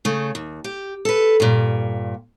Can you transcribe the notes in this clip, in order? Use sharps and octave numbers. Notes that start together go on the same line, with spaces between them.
C#3 A3
D#2
G4
A4 B4
G2 A#2